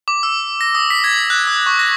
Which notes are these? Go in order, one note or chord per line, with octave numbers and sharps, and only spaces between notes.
D6
E6
A#6
D#6
B6
G#6
F#6
D#6
C#6
A#6